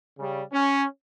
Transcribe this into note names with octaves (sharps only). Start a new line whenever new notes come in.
C#3 G3
C#4